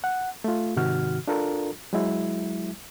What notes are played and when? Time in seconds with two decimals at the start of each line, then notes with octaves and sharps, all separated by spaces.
0.04 F#5
0.44 A3 F4
0.76 G#2 C3 D#3 F#4 F6
1.28 D4 F4 A4 A#4
1.93 F#3 G#3 E4